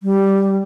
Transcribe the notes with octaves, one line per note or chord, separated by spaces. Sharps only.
G3